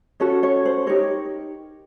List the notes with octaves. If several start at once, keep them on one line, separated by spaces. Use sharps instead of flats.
C#4 F#4 A4 C#5
C#5
C5
D#4 G4 A#4 C#5